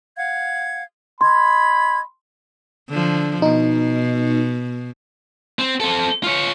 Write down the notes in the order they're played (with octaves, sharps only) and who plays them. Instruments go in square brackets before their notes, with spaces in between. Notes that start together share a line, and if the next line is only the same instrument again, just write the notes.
[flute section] F5 F#5 G#6
[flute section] D#5 G#6 [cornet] B5 [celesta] C6
[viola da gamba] D3 F3
[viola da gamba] B2 [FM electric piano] D#4
[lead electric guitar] C4
C4 A4
F4 C#5